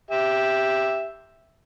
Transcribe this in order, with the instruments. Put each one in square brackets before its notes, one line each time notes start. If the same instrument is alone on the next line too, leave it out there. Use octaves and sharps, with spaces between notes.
[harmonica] G4 E5